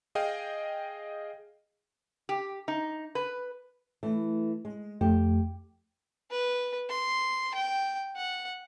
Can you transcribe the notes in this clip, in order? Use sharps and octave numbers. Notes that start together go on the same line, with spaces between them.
G#4 D#5 F5 G5
G4
D#4
B4
E3 A3
G#3
F2 A3 G4
B4
C6
G5
F#5